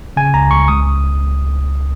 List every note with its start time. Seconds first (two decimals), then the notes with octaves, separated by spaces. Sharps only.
0.17 C#3 G#5
0.34 C#2 A#5
0.51 C#2 C#6
0.68 C#2 D#6